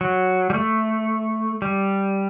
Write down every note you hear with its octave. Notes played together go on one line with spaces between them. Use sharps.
F#3
G3
A3
G3